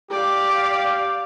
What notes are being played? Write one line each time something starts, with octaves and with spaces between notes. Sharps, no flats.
G4 D5 F5